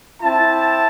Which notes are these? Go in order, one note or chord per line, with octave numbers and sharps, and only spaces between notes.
C4 E4 A5